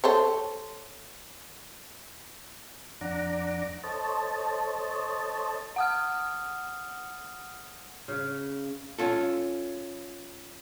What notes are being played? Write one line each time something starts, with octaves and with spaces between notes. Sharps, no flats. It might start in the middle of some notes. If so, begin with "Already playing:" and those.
A4 C5 C#5
F2 D4 F#5 A#5 D6
A4 C5 C#5 D#5 A5
F#5 D#6 F6
C#3
C#4 F4 A4